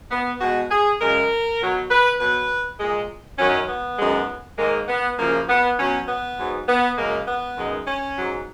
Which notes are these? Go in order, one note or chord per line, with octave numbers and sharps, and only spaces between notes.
B3
B2 G#3 F#4
G#4
F#2 C#3 G#3 A#4
B2 F#3
B4
B2 F#3 B4
A#2 G#3
F#2 D#3 F#3 C#4
B3
F#2 D#3 G#3
G#2 D#3 G#3 A#3
B3
F#2 C#3 F3 A#3
B3
B2 F#3 C#4
B3
G#2 F#3
B3
F#2 C#3 G#3 A#3
B3
F#2 D#3 G#3
C#4
G#2 F#3